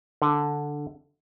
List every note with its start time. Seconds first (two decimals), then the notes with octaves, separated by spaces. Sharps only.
0.22 D3